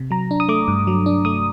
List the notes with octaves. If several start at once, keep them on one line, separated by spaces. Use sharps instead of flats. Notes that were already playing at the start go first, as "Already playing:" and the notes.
Already playing: C3
F#3 A#5
D4
D#6
A3 D6
G2
F#3
D4
A3 D#6